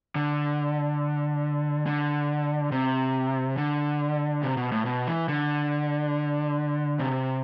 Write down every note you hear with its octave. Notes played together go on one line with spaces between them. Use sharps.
D3
D3
C3
D3
C3
B2
A2
B2
E3
D3
C3